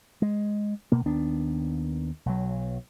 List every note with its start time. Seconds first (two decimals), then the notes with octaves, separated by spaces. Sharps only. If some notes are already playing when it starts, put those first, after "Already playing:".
0.22 G#3
0.92 B2 A#3
1.06 D#2 D#3 B3 D4
2.26 B1 F#3